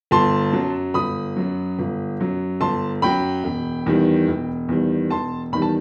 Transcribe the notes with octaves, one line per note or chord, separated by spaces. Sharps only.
G1 A5 C6
F#2 F#3
G1 B5 D#6
F#2 F#3
G1
F#2 F#3
G1 A5 C6
F#2 F#3 G5 B5
E1
E2 D#3 G3
E1
E2 D#3 G3
E1 A5 C6
E2 D#3 G3 B5
A5